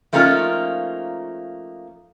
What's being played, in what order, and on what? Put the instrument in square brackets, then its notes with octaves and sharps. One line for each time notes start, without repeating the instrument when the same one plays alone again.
[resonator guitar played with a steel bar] F3 A3 A#3 C#4 D#4 F4